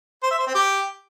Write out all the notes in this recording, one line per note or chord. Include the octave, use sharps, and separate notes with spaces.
C5
E5
C5
C4
G4